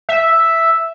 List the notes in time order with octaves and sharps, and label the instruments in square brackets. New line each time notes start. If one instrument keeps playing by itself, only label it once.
[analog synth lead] E5